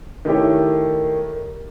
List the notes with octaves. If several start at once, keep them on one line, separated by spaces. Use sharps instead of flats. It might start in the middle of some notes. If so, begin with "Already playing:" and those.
D#3 A3 E4 G4 C#5